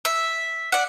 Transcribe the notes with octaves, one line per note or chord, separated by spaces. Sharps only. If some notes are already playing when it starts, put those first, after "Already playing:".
E5
D5 F#5